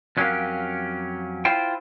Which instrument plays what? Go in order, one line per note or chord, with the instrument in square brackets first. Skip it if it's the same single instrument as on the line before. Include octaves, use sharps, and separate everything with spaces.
[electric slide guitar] F2 F#3 C#4 G4 A#4 F5
E4 F4 C5 G5